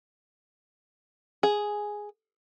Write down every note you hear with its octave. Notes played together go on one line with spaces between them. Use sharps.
G#4